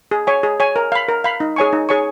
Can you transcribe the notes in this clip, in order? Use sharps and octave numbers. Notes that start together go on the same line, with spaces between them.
G#4
C#5 G#5
G#4
C#5 G#5
A#4
F5 B5
A#4
F5 B5
D#4
G#4 C#5 G#5 C#6
D#4
G#4 C#5 G#5 C#6